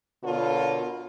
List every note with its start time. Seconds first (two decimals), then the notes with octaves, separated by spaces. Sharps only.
0.24 B2 D3 F4 A4 A#4 C#5